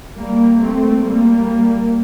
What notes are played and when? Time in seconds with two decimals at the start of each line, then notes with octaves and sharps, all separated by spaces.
0.17 G3 A#3
0.60 A3 C4
1.04 G3 A#3